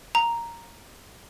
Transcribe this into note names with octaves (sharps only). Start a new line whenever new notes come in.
A#5